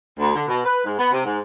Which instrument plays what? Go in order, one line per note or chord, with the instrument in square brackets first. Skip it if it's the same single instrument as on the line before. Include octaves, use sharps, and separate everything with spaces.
[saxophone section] D2
D3
B2
B4
G#2
B3
C3
G#2